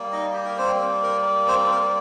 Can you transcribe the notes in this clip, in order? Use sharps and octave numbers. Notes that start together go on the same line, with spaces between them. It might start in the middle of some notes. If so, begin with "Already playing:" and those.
Already playing: G3 A#3
D#4 D#5
G4
A#4
C4 C5
A#4
C4 C5
A#4